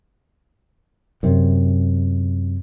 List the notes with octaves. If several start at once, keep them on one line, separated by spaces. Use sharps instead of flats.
F#2 C3